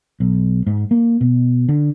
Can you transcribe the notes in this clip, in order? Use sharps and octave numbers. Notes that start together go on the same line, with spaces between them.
B1
G#2
A#3
B2
D3